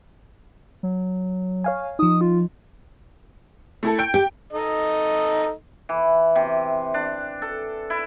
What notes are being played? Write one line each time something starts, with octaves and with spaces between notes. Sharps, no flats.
F#3
C#5 F5 G#5
F3 D#4 D#6
F4
A3 E4 A4
G5 G6 D7
G4 G5
D#4 A4 D#5
E3
C3
D4
A4
E4